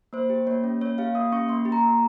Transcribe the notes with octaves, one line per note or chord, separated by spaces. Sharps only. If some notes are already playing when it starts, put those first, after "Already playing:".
A#3 C5
G4
A#3 C#5
C#4
A#3 C#5
G4 F5
A#3 D#6
C#4 C#6
A#3 C6
G4
A#5
A#3